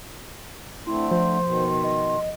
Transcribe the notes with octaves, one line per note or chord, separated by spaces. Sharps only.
D3 A3 C4 E4 C6
F3 C5
B2 D#3
D#5